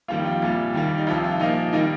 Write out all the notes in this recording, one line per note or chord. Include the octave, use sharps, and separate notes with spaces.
F2 D#3 G3 A#3 F4
F4
C2 A#2 G3
D#2 D#3 G3 A#3
D#4
C2 C3 F3 F4
F4
A#2 F3 A#3 D#4
D#3 G3 A#3 D#4